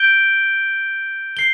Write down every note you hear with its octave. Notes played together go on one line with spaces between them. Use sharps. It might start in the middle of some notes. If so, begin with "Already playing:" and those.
Already playing: G6 D7 G7
C7 G7